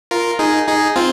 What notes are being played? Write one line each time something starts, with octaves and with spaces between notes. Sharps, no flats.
F4 A#4
D#4 G#4
D#4 G#4
C4 F4